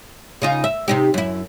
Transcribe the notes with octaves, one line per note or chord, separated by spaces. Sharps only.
C#3 D#4 F4
E5
C3 D#4 G4
F#2 E4